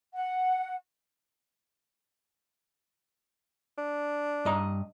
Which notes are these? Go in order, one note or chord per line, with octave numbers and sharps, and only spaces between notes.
F#5
D4
G2 D#5 A#5